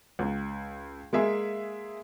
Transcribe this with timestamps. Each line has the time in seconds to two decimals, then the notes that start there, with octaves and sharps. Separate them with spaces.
0.19 C#2
1.13 G#3 A#3 G#4 E5 G#5